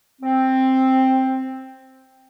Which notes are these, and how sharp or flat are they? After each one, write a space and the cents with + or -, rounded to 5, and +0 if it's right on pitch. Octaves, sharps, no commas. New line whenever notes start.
C4 +5